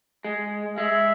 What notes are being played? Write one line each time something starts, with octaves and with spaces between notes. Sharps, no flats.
G#3
G#3 E5